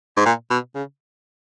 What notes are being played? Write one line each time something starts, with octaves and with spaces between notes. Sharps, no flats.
G#2
A#2
B2
C#3